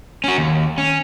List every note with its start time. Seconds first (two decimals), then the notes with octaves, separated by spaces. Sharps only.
0.24 C#4 F#4
0.38 D#2
0.78 C#4